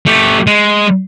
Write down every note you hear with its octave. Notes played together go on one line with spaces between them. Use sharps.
A3 G4
G#3